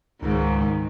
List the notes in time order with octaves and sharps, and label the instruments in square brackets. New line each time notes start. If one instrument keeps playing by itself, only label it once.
[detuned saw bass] C#2 [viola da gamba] G#2 D#3